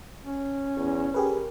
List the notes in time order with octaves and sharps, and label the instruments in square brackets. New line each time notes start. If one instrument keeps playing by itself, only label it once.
[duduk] C#4
[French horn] E2
[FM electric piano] G4 G#4 B4 [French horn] A#4